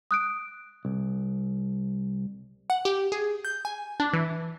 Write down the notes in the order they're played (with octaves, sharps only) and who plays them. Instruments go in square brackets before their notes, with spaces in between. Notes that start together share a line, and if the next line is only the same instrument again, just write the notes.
[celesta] D#6 F#6 D7
[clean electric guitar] C2
[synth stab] F#5
G4
G#4
G6
G#5
D4
E3